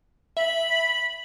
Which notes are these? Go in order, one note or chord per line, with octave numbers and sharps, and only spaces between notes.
E5 B5